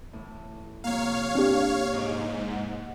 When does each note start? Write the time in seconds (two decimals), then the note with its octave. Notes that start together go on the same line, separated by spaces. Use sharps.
0.13 A2 E3
0.84 C3 F3 A#3 C#5 F5
1.35 C4 D4 G4
1.93 G#2 D#5 D6
2.53 F#5